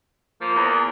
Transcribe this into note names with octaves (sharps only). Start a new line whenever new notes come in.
F3 A#3
E2